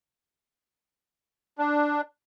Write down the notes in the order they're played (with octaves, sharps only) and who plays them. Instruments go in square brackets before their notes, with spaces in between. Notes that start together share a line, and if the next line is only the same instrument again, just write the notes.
[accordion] D4